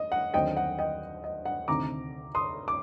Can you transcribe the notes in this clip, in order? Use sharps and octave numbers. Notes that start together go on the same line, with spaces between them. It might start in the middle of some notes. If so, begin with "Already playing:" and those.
Already playing: D#5
F#5
D#2 D3 F#3 C4 D#5 G5
F#5
D#5 G5
D#5
F#5
D2 C3 D#3 A3 C4 A#5 D6
C6 D#6
D6